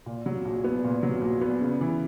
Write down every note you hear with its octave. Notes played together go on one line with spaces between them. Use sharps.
A#2
F#3
A#1
B3
A#2
F#3
A#1
B3
C#3
E3